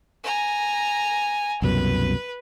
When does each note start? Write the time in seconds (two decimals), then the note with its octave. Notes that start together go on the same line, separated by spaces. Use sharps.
0.24 G#5 A#5
1.62 C2 F#2 B2 B4